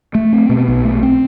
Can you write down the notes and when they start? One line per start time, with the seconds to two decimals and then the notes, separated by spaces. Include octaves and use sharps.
0.15 A3
0.33 C4
0.49 B2
0.68 B1
0.85 A3
1.03 C4